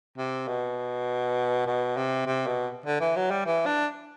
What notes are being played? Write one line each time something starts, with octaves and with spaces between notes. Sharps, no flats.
C3
B2
B2
C3
C3
B2
D3
E3
F#3
G3
E3
D4